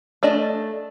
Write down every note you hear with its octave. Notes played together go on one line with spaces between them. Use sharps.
A3 D4 D#5